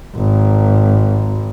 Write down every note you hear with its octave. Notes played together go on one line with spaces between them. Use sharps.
G#1